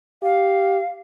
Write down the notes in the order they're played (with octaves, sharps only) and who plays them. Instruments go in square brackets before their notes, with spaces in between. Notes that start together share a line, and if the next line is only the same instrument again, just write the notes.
[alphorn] G4 [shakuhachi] F5